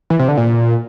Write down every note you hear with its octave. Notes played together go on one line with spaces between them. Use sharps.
E3
C3
D3
A#2